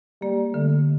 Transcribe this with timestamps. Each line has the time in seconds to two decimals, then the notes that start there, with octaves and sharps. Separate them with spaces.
0.22 G3 A#3
0.54 D3 A3